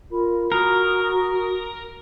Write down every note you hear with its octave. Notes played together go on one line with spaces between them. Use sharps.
F4 A#4 B5
F#4 A#4 D#6